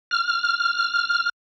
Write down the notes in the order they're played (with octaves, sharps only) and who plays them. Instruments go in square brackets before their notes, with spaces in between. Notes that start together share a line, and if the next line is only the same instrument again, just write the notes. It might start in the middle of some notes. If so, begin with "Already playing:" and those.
[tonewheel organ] F6